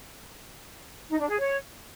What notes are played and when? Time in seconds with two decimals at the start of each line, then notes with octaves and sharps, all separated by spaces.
1.09 D#4
1.19 D4
1.29 G#4
1.39 C#5